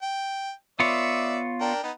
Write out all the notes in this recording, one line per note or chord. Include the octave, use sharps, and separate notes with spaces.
G5
B3 F4 C#5 D5 E5
D4 A#4 G5
B3 D#4